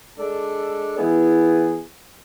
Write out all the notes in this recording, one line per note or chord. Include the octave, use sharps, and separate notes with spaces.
G#3 D4 A4
E3 B3 E4 G#4